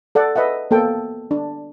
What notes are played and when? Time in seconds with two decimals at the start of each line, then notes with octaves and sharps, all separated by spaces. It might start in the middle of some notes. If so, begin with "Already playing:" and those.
0.15 A4 D5 F#5
0.36 B4 D#5 E5 F#5
0.71 A#3 B3 A4 G5
1.31 D4